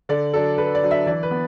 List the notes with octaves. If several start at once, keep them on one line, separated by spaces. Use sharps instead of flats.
D3 D5
F#3 D4 A4
D3 B4
D5
F#3 D4
E5
E3 D5
B4
B3